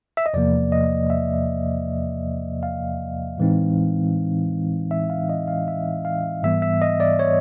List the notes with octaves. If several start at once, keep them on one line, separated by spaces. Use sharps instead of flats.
E5
D#5
E2 C3 F3 A#3 D5
D#5
E5
F5
A2 E3 G#3 C4 D#4
E5
F5
D#5
F5
E5
F5
G#2 E3 G3 B3 E5
E5
D#5
D5
C#5